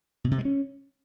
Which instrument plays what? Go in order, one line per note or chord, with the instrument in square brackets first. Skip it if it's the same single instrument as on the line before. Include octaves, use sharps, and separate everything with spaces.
[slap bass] B2
C3
G#3
C#4